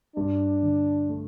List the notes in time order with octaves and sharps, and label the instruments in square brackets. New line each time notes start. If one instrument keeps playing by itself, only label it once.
[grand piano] G2 [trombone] D4
[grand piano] D3
A3